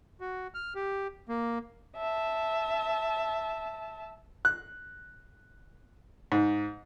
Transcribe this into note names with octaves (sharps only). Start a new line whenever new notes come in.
F#4
F6
G4
A#3
E5 A5
F#6
G#2